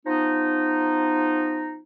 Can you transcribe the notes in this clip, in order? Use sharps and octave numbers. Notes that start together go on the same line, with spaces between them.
F3 B3 D#4